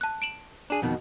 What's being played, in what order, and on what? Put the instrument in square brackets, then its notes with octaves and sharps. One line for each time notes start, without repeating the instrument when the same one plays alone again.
[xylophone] A5 F#6
D7 E7 F#7
[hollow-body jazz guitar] D4 G#4
F2 B2 D#3